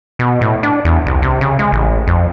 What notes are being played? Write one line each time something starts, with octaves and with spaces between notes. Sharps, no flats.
B2
A2
D4
E2
C2
C3
C#3
G#3
A1
F2